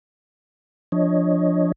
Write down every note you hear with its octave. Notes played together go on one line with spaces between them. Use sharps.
F3 D4 C#5 D#5